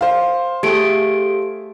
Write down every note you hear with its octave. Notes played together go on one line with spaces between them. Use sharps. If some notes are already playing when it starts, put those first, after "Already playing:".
C5 F5
A3 G4 G#4 D7